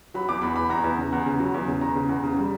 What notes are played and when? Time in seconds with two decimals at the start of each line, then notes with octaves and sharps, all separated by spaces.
0.14 F#3 B5
0.28 E2 D6
0.42 E2 B5
0.56 E2 B5
0.70 E2 A#5
0.84 E2
0.98 C#3
1.12 E2
1.26 C#3
1.40 F#3
1.54 E2
1.67 C#3
1.81 E2 A#5
1.95 C#3
2.09 E2
2.24 C#3
2.38 G3